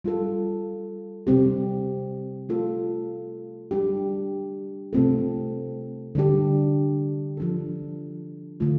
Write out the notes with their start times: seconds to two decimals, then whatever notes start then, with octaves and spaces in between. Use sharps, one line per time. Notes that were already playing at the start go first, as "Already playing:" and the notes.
0.04 G3 F4 A4
1.27 C3 G3 C4 G4
2.49 A3 F4 A4
3.71 G3 D4 G4
4.93 C3 A3 C4 F4 A4
6.15 D3 G3 D4 G4
7.37 F3 D4 A4
8.60 D3 A3 F4